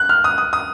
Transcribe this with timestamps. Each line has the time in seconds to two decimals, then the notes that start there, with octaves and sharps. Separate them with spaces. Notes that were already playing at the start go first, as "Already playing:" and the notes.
Already playing: F#6
0.09 F6
0.24 D#6
0.38 D#6
0.53 D#6